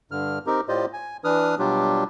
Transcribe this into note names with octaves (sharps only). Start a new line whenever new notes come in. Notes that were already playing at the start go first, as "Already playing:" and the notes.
G2 D3 F6
C4 D#4 G4 A#4
A2 F4 G4 C5 D5 D#5
G#5
E3 D4 B4 D#6 F6
B2 F#3 G3 D4 F4 G4